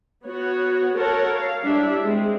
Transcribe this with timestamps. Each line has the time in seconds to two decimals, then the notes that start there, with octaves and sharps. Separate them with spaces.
0.24 B3 F#4 C#5
0.97 A4 A#4 C#5 F#5 A5 A#5
1.33 F5
1.64 G3 D4 E4 E5
2.03 G#3 C4